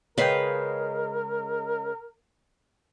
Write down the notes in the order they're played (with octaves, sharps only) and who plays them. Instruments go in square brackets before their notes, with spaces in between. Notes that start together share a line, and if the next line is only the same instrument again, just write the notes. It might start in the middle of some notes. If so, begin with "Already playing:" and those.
[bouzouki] C#3 G#3 G5 [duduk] A#4 [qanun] B4 F5